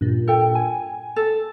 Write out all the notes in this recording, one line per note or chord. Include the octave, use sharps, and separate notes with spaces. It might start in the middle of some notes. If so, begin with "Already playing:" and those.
G2 A#2
A4 G5
G#5
A4